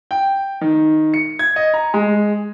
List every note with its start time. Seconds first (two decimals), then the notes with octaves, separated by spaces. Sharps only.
0.11 G5
0.61 D#3
1.14 C#7
1.39 G#6
1.56 D#5
1.74 A#5
1.94 G#3